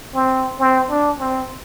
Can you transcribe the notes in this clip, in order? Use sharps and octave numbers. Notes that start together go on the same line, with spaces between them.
C4
C4
D4
C4